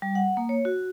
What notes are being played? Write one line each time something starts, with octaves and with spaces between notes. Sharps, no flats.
G3
F#5
A#3
C#5
F#4